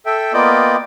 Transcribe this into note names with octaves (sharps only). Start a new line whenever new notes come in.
A4 E5 G5
A#3 B3 F4 D5 D#5 G5